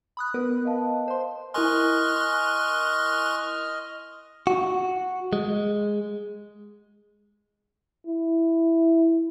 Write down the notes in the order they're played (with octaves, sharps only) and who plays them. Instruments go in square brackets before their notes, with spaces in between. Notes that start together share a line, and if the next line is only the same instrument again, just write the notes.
[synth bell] B5 D#6 F#6
B3 A#4 B4
[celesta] D#5 F5 A5
[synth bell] C5 C6
[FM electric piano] E4 A#4 G#5 [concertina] D#5 F6 [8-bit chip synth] C6 C#6 F#6
[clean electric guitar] F#4
G#3
[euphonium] E4